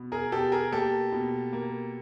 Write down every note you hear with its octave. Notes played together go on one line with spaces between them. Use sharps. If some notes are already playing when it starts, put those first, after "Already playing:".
Already playing: B2
G#4 A#4
B2 G4 A4
G#4 A#4
A#3 G4 A4
B2
A#3